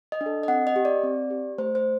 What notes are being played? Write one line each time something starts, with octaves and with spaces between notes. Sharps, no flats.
D#5
D4
A4
D#5
C4 F#5
D#5
G4
D5
C4
G4
A3 C5
C5